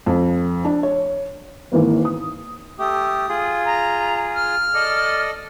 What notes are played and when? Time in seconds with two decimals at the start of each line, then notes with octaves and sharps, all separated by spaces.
0.06 F2
0.65 D4
0.83 C#5
1.72 G#1 E3 A#3 B3
2.05 D#6
2.79 A3 G4 D#6
3.29 F4 G#4
3.66 A#5
4.35 F6
4.74 A4 D5 D#5